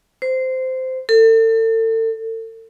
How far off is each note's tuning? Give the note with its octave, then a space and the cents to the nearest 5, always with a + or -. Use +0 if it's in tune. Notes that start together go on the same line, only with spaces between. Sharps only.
C5 -15
A4 +35